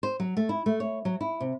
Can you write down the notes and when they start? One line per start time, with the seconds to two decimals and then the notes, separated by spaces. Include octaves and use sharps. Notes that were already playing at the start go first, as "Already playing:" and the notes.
0.03 C5
0.20 F#3
0.37 A3
0.49 E4
0.66 A3
0.80 C#5
1.05 F#3
1.21 E4
1.41 C3